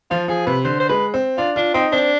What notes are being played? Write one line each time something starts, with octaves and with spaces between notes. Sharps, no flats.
F3 F4
F3 G#4
C3 B4
D3 C5
C5
G#3 B4
C4
D4 F4
D4 F4
C4 D#4
C4 D4